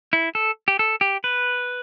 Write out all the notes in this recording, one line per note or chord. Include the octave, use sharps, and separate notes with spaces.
E4
A4
G4
A4
G4
B4